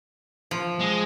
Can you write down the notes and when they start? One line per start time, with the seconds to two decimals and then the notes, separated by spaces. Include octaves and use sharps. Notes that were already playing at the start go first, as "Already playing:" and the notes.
0.51 F3
0.80 G#3